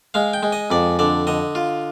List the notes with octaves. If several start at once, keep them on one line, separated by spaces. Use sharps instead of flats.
G#3 F5
G5
G#3
D#5
F2 D5
D3 D5
D3 D#5
F4